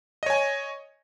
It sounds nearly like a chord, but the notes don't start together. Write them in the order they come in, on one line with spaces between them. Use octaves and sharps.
D#5 C#5 G#5